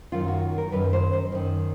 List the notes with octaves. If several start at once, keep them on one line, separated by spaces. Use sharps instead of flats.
F#2 D#3 F4
F#4
A#4
F#2 D#3 B4
C5
C5
F#2 D#3